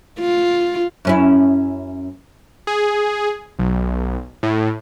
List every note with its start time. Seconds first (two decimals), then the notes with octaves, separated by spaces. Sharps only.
0.19 F4
1.05 F#2 C#4 E4
2.67 G#4
3.59 B1
4.43 A2